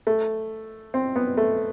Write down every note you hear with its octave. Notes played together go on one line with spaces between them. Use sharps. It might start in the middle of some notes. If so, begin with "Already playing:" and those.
A3
C4
B3
A3